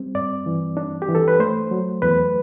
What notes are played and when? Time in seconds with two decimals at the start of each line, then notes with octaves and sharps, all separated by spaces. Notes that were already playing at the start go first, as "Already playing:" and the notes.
Already playing: G3 C4
0.15 G2 D5
0.46 E3
0.77 D4
1.02 G4
1.09 E3
1.15 A4
1.28 B4
1.39 A3 C5
1.71 F#3
2.02 E2 B4